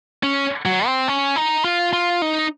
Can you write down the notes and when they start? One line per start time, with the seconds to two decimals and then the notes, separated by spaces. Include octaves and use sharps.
0.23 C#4
0.66 F#3
0.86 C4
1.08 C#4
1.36 D#4
1.64 F4
1.93 F4
2.22 D#4